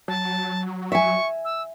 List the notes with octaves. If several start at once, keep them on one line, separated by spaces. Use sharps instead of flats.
F#3 A5
E5 G#5 C#6
E6